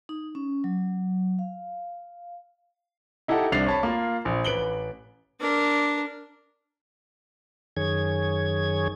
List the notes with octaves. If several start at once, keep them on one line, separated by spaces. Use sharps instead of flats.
D#4
C#4
F#3
F5
D#4 E4 G4 A4 F#5
C2 D4 A6 C7 F7
C#5 A5 B5
A#3 F4
A#1
A1 B4 D7 F#7 G7
D4 A#4
F#2 D#3 G#4 C#5 G#6